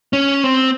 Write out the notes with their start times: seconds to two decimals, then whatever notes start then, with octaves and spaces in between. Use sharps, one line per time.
0.13 C#4
0.44 C4